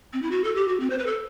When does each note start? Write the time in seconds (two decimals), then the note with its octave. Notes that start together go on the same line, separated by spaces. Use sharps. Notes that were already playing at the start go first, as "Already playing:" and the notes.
0.13 C4
0.22 E4
0.31 F#4
0.44 A4
0.56 G4
0.68 F#4
0.80 C4
0.90 C5
0.98 B4
1.07 A4